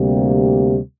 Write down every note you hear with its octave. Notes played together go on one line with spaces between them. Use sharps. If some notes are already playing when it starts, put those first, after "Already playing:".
Already playing: D2 C3 G3 A#3